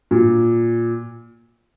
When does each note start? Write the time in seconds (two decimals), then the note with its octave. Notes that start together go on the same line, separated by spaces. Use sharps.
0.11 A#2